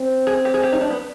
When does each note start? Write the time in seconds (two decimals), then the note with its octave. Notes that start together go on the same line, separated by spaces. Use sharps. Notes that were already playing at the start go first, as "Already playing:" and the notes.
Already playing: C4
0.27 G#4
0.45 G4
0.54 G#4
0.63 G4
0.72 D#4
0.81 D4
0.90 B3